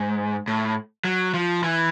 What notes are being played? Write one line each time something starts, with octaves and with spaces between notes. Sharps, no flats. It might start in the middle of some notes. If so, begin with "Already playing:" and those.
Already playing: G#2
A2
F#3
F3
E3